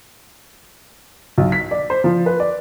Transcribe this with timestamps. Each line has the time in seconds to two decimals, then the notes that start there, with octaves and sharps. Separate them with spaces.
1.37 B1
1.52 B6
1.71 D5
1.90 C5
2.04 F3
2.26 B4
2.40 D5